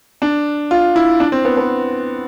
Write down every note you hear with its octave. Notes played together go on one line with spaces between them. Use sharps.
D4
F4
E4
D4
C4
B3
B3